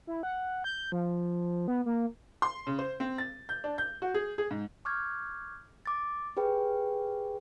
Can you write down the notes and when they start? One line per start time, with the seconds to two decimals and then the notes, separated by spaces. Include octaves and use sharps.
0.07 E4
0.23 F#5
0.64 G6
0.92 F3
1.68 B3
1.86 A#3
2.42 C6
2.67 C#3
2.79 C5
3.00 C4
3.18 A6
3.49 G6
3.64 D4
3.78 G6
4.02 F#4
4.14 G#4
4.38 G#4
4.51 G#2
4.85 C#6 D6 F6 G6 G#6
5.86 D6 A6
6.37 G4 G#4 B4 G5